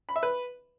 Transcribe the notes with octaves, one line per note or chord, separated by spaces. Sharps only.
B5
E5
B4